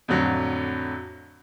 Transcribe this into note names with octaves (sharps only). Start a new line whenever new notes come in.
F2 A2 D3 F#3